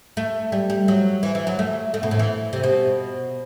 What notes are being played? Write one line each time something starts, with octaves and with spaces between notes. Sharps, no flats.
A3
G3
G3
F#3
E3
E3
F#3
A3
A3
B2
A2
E3
C3
B2